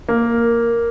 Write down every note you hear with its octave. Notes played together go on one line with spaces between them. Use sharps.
A#3